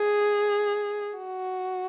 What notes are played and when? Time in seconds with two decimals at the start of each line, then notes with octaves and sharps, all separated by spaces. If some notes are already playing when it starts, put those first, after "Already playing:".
Already playing: G#4
1.17 F#4